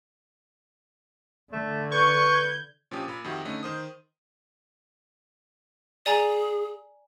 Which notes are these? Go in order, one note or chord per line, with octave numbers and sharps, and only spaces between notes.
D3 A3
B4 C#6 G6 G#6
A#2 F3 C#4 D4 G4 D#6
A#2 B5
F2 D#3 F#4 G4 E5
D3 A3 C#4 D#4
D#3 C5 D#6
G#4 D5 G#5 A#5